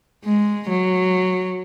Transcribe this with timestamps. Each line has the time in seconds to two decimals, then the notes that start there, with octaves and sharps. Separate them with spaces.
0.25 G#3
0.69 F#3